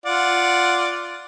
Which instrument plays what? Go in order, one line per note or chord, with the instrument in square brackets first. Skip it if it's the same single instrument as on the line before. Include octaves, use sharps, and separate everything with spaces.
[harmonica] F4 D5 F#5